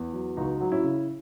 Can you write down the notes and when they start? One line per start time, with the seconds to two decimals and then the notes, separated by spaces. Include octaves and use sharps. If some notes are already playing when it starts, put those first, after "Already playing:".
Already playing: E2
0.13 F#3
0.37 C#2 D#4 F#4
0.61 F#3
0.72 C#4 E4
0.84 C#3